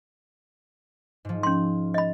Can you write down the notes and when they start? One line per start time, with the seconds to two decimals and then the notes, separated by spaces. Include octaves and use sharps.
1.25 G#2 F3
1.43 C#4 C6
1.94 D#5 B5